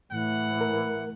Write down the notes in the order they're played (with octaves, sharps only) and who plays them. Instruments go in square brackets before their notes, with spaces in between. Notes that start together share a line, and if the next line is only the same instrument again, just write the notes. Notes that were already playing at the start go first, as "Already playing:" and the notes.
[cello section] A2 [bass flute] E3 [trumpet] F#5
[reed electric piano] A#4